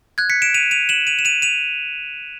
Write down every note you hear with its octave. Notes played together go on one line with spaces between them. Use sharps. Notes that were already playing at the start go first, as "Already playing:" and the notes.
F#6 G#6
B6 C#7
D7 E7
D#7 F7
D#7 F7
E7 F#7
D#7 F7
E7
D#7 F7
D#7 F7